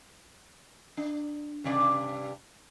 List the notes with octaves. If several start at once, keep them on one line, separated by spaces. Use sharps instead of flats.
D4
G2 C3 D5